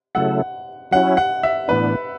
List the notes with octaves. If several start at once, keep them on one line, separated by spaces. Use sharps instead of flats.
C#3 F#3 A3 E4 A4 F#5
F#3 C#4 E4 F#5
F#5
E5
A2 E3 B3 D4 B4